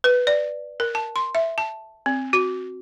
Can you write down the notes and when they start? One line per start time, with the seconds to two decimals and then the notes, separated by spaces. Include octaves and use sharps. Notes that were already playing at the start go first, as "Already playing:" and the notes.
0.04 B4
0.27 D5
0.80 A#4
0.95 A5
1.16 C6
1.35 E5
1.58 A5
2.06 C4
2.33 F#4